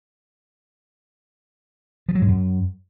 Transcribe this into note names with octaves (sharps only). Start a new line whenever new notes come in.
F3
F#3
G#2
F#2